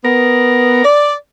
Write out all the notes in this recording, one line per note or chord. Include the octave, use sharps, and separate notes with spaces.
B3 A#4
D5